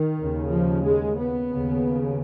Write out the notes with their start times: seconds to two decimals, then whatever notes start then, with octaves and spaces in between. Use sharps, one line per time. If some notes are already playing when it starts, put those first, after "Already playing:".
Already playing: D#3
0.19 D#2 C#3
0.51 F3
0.85 G#3
1.18 B3
1.50 D#2 C#3